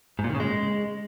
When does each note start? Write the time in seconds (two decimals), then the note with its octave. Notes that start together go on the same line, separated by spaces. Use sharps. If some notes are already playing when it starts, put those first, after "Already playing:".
0.19 G#2
0.24 A#2
0.29 D#3
0.35 C#3
0.40 G#3